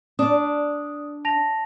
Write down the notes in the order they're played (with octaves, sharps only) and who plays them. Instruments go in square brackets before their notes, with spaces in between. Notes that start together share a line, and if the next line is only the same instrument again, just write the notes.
[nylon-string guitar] D4 [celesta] D#6
[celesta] A5 A#6 F7